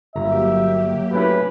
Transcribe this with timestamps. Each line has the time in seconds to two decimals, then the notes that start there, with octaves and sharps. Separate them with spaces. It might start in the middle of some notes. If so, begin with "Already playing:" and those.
0.16 G1 F#3 A#3 G4 E5 A#5
1.13 A3 C#4 E4 B4